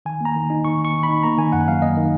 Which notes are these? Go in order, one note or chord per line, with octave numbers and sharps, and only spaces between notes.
D#3 G#5
A#3 A#5
D#3
D#4
D#3 C#6
A#3 C#6
D#3
B5
D#4
A#3 A#5
D#3 G#5
F#2 F#5
F#3 F5
A#3 D#5
D#3